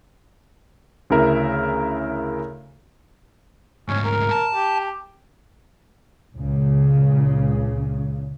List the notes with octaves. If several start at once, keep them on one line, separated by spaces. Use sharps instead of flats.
D2 C#3 E4 A#4 E5
D2 G#2 C#4
A#4
A5
G4
C#2 A#2 C#3